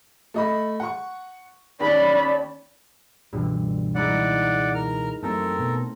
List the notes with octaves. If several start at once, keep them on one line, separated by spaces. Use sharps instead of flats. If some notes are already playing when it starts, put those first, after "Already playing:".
A3 D#5 B5
F#5 C#6
D#2 C#4 D5 B5
C#2 G2 B2 D3 E3
G#3 D#4 E4 D5 F#5
A#4 F6
F#2 A3 C4 A4 A#4
B2